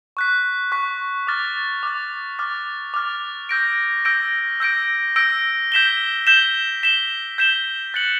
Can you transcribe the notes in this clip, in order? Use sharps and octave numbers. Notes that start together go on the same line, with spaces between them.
C#6 F#6 B6
C#6 F#6 B6
D6 F6 A6
D6 F6 A6
D6 F6 A6
D6 F6 A6
E6 G6 A#6 D7
E6 G6 A#6 D7
E6 G6 A#6 D7
E6 G6 A#6 D7
G6 B6 E7 G7
G6 B6 E7 G7
G6 B6 E7 G7
G6 B6 E7 G7
F#6 A6 C#7 F#7